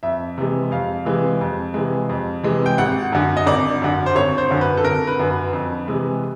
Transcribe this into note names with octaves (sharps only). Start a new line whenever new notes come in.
F2 E5
C3 E3 G#3
F2 F5
C3 E3 G#3
F2
C3 E3 G#3
F2
C3 E3 G#3
G5
G#1 F#5
F#2 D3
D#5
G#1 D5
F#2 D3
C5
G#1 C#5
C5
F#2 D3
B4
A4
G#1 A#4
B4
F#2 D3
B4
F2
C3 E3 G#3